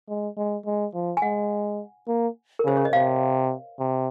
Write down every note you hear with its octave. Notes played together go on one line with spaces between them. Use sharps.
G#3
G#3
G#3
F3
G#5
G#3 F#5
A#3
A#4
C#3 C5
C#5
D#5
C3 F5
C3